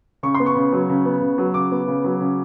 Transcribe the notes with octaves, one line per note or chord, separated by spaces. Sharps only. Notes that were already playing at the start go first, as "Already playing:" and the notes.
C#3 C#6
C6
B3
C#6
C#3
F#3
C#3
B3
C#3
F#3
C#3 D6
B3
C#3
F#3
C#3